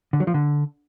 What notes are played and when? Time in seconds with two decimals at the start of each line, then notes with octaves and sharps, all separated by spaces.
0.13 D3
0.20 F#3
0.27 F3
0.34 D3